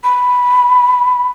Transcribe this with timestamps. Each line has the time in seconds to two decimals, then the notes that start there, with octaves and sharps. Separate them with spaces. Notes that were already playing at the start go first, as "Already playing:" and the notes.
0.04 B5